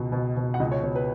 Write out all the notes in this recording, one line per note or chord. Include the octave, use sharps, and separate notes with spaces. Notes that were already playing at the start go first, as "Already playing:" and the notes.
Already playing: C#2 B2
B2
B2
F#5
C#2 D#5
C#5
B2 C#5
B4